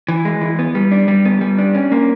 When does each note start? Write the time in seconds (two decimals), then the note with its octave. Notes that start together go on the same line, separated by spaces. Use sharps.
0.08 E3
0.25 G#3
0.42 E3
0.59 B3
0.75 G3
0.91 D4
1.08 G3
1.25 B3
1.41 G3
1.58 D4
1.75 C#4
1.92 A#3